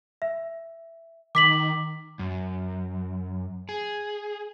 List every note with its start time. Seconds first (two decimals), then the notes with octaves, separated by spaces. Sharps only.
0.22 E5
1.35 D#3 D6 B6 F#7
2.19 F#2
3.69 G#4